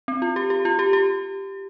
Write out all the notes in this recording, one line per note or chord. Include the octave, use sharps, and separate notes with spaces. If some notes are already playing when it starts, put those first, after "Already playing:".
C4
F4
G4
G4
F4
G4
G4